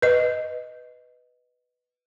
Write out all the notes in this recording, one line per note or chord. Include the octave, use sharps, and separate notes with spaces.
B4 D#5